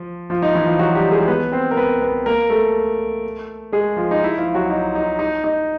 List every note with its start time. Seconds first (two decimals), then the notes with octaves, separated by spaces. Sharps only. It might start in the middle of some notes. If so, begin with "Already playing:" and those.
Already playing: F3
0.30 F3 F4
0.42 D#4
0.55 E3 E4
0.66 F3 F4
0.79 F#3 F#4
0.95 G3 G4
1.11 G#3 G#4
1.28 B3 B4
1.52 C4 C5
1.71 A#4
1.77 B3 B4
2.02 B3 B4
2.26 A#3 A#4
2.50 A3 A4
3.72 G#3 G#4
3.97 F3 F4
4.11 D#4
4.24 E4
4.38 F3 F4
4.54 F#3 F#4
4.70 D#4
4.95 D#4
5.19 D#4
5.44 D#4